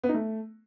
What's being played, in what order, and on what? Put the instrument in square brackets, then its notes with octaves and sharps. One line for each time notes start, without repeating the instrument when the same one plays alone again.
[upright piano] B3
D#4
A3